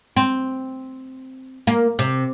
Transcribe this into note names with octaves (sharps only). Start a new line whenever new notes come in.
C4
A#3
C3